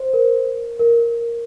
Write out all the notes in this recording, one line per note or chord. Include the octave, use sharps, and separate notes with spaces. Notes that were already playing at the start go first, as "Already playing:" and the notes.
Already playing: C5
A#4
A#4